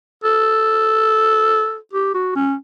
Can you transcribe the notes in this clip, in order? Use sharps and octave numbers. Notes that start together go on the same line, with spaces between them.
A4
G4
F#4
C#4